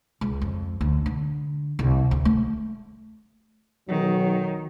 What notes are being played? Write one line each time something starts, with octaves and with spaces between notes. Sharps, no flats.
C#2
F2
D2
D3
C2
D2
A3
B1 D#3 F#3